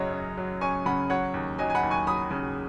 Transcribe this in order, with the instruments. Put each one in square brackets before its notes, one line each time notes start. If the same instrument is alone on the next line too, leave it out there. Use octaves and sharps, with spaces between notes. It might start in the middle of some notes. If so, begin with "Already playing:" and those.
Already playing: [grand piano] F#2 C#3 F#3 C#5 D#5
C#4
F#3
C#4 G#5 C#6
C#3 F#5 B5
F#3 C#5 F#5
D#2
F#3 D#5 G#5
G#5
F#5 B5
D#2
G#5 C#6
F#3 B5 D#6
C#3